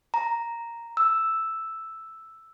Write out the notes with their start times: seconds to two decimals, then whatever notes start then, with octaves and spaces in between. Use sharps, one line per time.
0.14 A#5
0.97 E6